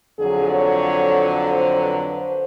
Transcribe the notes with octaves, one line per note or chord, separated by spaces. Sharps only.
F2 D3 F#3 G#4
C#5
C5
B4
C5